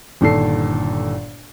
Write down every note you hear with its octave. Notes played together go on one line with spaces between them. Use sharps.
G1 A#2 D#3 A4 C7